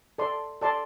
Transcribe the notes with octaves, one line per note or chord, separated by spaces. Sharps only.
A4 D5 A5 C6
A4 D5 A5 C6